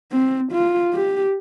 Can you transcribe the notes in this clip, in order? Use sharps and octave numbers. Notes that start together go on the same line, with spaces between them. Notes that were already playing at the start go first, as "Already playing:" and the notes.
C4
F4
G4